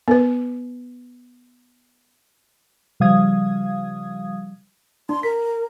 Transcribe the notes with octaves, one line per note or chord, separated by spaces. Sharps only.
B3 B4
C#3 F3 G3 F5 D#6 G#6
D4 C6
A#4 B6